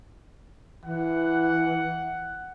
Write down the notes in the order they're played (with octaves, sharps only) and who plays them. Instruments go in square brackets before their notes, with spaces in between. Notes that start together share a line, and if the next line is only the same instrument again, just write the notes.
[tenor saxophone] E3 [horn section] F#5